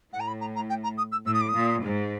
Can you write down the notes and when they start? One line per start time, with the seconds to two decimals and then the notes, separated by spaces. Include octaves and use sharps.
0.13 A2 F#5
0.20 A#5
0.27 B5
0.41 A#5
0.55 A#5
0.69 G5
0.83 A#5
0.97 D#6
1.12 E6
1.26 A2 E6
1.34 D#6
1.41 D6
1.48 D#6
1.55 A#2
1.82 G#2